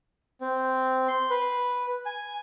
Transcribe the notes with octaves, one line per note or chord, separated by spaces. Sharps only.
C4
C6
B4
G#5